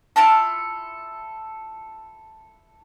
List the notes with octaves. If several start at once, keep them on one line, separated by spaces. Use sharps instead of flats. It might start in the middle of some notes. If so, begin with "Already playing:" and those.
E4 F4 A4 A5